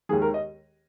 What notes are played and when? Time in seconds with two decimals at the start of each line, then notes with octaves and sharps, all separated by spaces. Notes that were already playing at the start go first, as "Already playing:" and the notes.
0.09 D#2 D#3 G#3 G#4
0.22 A#4
0.34 D#5